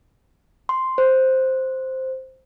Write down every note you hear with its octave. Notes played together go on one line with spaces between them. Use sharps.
C6
C5